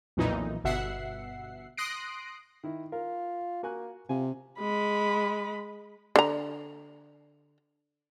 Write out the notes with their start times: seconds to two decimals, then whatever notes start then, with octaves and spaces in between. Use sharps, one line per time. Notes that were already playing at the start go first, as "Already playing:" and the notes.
0.17 B1 F2 A#2 E3 D#4
0.64 G1 B2 E5 F#5 C7
1.77 C6 D#6 F#6 A#6 C7 D7
2.64 D#3 E4
2.92 F4 A#4
3.63 A#3 F#4 G#5 F#6
4.09 C3 F4 G#5
4.59 G#3 B5
6.16 D3 A#5